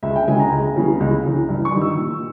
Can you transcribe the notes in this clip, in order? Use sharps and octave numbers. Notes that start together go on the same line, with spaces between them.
C#2 E5
G5
C#3 G#3 G#5
A#5
C#2
C#3 E3 G3 B3
C#2
C#3 E3
G2
C#6
D#3 G3
E6
A#2